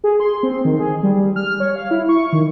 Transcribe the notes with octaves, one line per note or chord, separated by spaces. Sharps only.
G#4
C6
C4
D#3
G#4
G3
F6
C#5
F5
E4
C#6
D#3